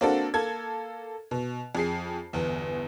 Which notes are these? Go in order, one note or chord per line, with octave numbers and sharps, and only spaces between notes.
A#3 C4 D4 F#4 A4
A#3 A4 G#6
B2
F2 G#4 C7
G1 E2